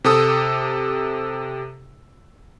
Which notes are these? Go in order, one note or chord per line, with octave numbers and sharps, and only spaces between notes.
C3 G4 A4 D#6 E6